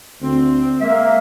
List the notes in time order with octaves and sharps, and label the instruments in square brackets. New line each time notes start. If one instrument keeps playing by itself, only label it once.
[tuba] D2 [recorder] C4
[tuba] G#3 [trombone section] A#3 [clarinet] E5